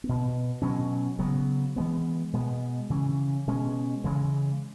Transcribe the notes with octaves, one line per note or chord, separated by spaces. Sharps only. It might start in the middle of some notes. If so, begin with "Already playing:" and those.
B3
B2
B2 F#3 C#4
C#3 F#3 B3
E3 G#3 B3
B2 G#3 B3
C#3 E3 C#4
B2 G#3 C#4
C#3 E3 G#3